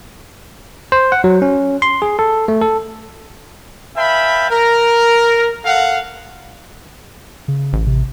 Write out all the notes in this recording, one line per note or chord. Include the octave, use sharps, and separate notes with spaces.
C5
F#5
F#3
C#4
C6
G#4
A4
A3
A4
B4 E5 F5 G5 A5 B5
A#4
A4 F5 F#5
C#3
A1
C3